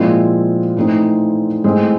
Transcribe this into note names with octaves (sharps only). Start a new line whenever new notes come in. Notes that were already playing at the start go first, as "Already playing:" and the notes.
Already playing: A#2 F3 G#3 C4 E4
A2 E3 A3 C4 D#4
A2 E3 G#3 C4